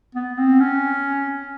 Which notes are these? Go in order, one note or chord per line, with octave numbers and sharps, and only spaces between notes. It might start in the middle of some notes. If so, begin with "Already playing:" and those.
B3
C4
C#4